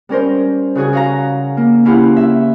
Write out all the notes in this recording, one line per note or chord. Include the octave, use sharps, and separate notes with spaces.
G3 C#4 A#4 C5
C#3 F#4 G#4 G#5
F#4 F5 A#5
A#3
C#4 E4 F4 G4 F#5
E5